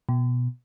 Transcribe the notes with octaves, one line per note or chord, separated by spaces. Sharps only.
B2